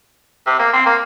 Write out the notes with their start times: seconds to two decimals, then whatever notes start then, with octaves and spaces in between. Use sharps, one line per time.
0.47 C3
0.59 A#3
0.73 C4
0.86 A#3